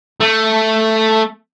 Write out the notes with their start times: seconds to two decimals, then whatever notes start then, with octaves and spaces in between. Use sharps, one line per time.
0.20 A3